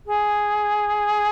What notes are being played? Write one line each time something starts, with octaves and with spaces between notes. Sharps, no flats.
G#4